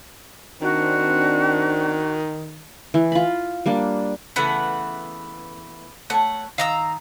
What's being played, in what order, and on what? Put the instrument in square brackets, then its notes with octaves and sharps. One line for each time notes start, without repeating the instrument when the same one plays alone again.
[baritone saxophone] D#3 [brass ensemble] C4 D4 [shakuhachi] F#4
[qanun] E3
F4 B5
G3 A#3 D4
[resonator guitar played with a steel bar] C#3 E3 A3 [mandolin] B3 F#5
[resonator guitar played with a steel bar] A3 C#5 [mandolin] F#5
[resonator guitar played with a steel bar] D#3 [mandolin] F5 A#5 E6